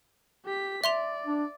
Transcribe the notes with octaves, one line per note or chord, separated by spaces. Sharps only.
G4 B6
D5 E5 C6 F7
D4